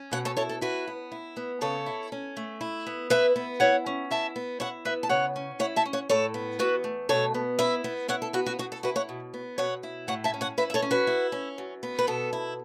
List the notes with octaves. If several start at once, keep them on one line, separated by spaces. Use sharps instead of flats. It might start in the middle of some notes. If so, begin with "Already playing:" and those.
Already playing: C#4
B2 C#5 F#5
A4 C#5
E4 A4 C#5
A4
E4 F#4 B4
B3
E4
B3
C#3 A4 C#5
E4
C#4
A3
E4
B3
E4 B4 E5
B3
E4 C#5 F#5
C#4
E4 E5 A5
B3
E4 C#5 F#5
B3 B4 E5
A5
C#3 C#5 F#5
C#4
E4 C#5 F#5
E5 A5
C#4
C#5 F#5
A2 A4 C#5
B3
E2 F#4 B4
A3
B2 A4 C#5
B3
E4 B4 E5
B3
E4 C#5 F#5
A4
B3 F#4
F#4
B2 F#4
A4
E4 F#4 B4
C#5 F#5
B2
B3
B2 C#5 F#5
E4
A2 C#5 F#5
E5 A5
C#4
C#5 F#5
E4 B4 E5
E5
A4 C#5
C#4
F#4 B4
E4
C#4
F#2
B3
B4
B2 A4
E4